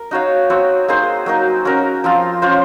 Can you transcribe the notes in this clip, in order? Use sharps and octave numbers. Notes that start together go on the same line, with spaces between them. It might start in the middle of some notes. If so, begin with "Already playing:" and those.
Already playing: A#4
D#4 F#4 C#5 F5
C4 F#4 C#5
A#3 D#4 G#4 C5
F#3 A#3 D#4
C#4 F#4 A#4
F3 C4 F4
C#4 F4 C5